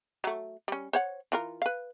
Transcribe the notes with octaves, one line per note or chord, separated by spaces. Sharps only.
F#3 A3
G3 C#4
C5 C#5 F#5
E3 F4 A#4
B4 F5